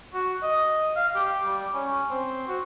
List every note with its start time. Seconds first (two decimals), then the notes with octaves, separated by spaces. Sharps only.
0.14 F#4
0.43 D#5
0.96 F5
1.15 G4
1.45 G3
1.74 C#4
2.10 C4
2.47 F#4